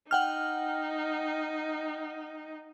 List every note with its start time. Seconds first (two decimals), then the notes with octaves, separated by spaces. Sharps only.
0.11 D#4 F#5 G5 F6